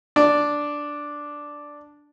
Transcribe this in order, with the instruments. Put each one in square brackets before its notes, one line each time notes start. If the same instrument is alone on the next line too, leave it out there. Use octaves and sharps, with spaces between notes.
[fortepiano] D4 D5